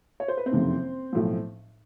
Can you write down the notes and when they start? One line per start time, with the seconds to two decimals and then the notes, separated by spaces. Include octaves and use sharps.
0.20 C#5
0.28 C5
0.37 B4
0.46 C4 C5
0.51 F#1 F2 C3 D#3
1.13 B1 A2 F3